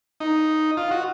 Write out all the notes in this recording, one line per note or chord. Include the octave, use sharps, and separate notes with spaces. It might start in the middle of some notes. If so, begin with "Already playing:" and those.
D#4
F4
F#4